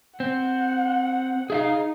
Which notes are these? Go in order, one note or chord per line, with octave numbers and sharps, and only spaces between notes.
C4 F#5
D#4 G#4 E5 F5